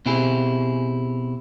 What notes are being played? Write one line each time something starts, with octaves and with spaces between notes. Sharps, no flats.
B2 C4 E4 G4 G#4